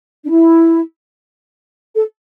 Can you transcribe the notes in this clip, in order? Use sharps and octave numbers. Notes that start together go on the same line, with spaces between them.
D4
E4
A4